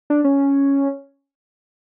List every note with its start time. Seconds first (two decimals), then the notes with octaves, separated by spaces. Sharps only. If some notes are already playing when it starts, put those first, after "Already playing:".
0.10 D4
0.24 C#4